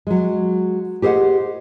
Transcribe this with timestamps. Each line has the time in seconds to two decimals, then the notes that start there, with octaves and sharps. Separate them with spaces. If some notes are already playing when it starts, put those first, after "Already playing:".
0.07 F#3 G#3
1.02 G4 G#4 C5 D#5 F#5